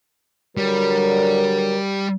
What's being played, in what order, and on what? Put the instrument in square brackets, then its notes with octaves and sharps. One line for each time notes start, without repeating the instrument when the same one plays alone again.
[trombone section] D3 F#3 A#4 [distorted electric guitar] G3